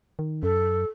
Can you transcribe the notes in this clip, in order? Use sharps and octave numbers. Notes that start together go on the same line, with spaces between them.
D#3
F#2 A4